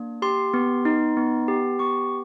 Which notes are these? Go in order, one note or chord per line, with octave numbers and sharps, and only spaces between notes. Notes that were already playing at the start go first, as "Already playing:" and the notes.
Already playing: A#3 D4
G4 C6
B3
D#4
B3
G4
B3 C#6